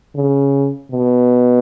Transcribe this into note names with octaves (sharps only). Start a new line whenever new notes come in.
C#3
B2